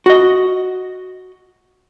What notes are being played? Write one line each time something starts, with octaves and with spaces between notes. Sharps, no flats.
F#4 D#5